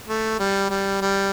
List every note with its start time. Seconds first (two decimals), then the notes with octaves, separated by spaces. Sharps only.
0.09 A3
0.39 G3
0.70 G3
1.01 G3